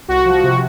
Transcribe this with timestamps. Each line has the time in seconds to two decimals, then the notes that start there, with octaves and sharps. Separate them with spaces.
0.08 C2 F#4
0.25 F3
0.43 C3